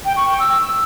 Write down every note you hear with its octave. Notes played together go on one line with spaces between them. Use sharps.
G5
C#6
G5
E6